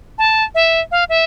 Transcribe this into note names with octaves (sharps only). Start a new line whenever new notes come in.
A5
E5
F5
E5